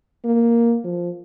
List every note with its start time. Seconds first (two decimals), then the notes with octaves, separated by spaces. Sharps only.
0.25 A#3
0.84 F3